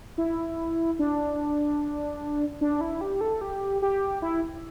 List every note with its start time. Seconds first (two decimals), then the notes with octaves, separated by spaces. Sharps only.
0.18 E4
0.99 D4
2.61 D4
2.81 E4
3.01 G4
3.21 A4
3.41 G4
3.82 G4
4.22 E4